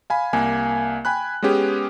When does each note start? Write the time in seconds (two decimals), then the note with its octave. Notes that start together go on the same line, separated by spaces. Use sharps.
0.10 F5 G#5 B5
0.33 C2 A#3 G#5
1.05 G5 G#5 B5 F#6
1.42 G#3 B3 C#4 G4 G#4